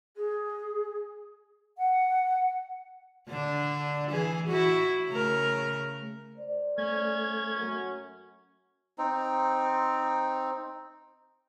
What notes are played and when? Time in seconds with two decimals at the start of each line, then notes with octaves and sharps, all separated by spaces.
0.16 G#4
1.78 F#5
3.28 D3 D4
4.10 E3 G#4
4.48 E4 F#4
5.08 C#3 A3 A#4
6.37 C5 D5
6.78 A3 C#4 G#6
7.53 F#2
8.98 C4 D#4